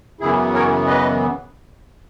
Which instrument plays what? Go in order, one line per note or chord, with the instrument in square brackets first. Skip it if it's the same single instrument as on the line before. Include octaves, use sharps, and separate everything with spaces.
[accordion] F#2 C#3 E3 B3 E4 G#4
A#4 C#5
B4 D#5